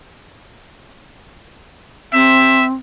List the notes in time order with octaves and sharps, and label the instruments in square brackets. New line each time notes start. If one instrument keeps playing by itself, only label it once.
[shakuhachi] C4 [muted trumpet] E5